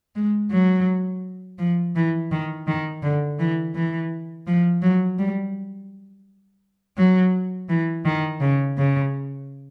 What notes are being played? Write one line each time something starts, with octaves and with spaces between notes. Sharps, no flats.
G#3
F#3
F3
E3
D#3
D#3
D3
E3
E3
F3
F#3
G3
F#3
E3
D#3
C#3
C#3